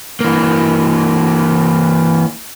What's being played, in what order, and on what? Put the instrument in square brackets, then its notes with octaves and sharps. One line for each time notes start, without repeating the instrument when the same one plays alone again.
[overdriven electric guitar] E3 A#3